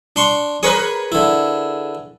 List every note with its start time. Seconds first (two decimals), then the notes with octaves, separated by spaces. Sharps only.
0.16 D4 C6 C#6
0.63 G#4 A#4 B4 C#5 C#6 D#6
1.12 D3 E4